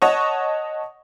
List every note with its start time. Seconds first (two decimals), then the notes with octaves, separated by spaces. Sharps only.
0.02 C#5 D#5 F#5 A5 C#6